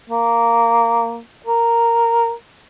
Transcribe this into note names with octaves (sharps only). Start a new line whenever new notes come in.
A#3
A#4